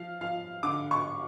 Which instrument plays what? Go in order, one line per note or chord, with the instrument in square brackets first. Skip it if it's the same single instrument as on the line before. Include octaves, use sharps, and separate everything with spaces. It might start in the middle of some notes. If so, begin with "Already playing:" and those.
Already playing: [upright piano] F3 F5
F3 F5
D3 D6
C#6